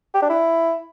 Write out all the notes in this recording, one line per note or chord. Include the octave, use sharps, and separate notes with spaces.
G4
D4
E4